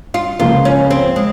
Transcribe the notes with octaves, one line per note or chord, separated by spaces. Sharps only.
F4
C#2 C#3 F3 A#3 F4
C#4
C4
G#3